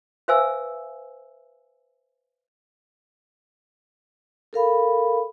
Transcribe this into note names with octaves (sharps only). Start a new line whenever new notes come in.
B4 C5 E5 F5 G#5 E6
A4 A#4 F5 B5